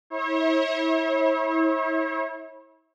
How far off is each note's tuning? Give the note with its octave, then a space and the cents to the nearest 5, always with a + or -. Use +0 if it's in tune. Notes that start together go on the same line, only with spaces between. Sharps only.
E4 -30 C#5 -40